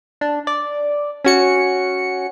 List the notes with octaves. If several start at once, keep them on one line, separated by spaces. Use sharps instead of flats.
D4
D5
C#4 F#4 C#7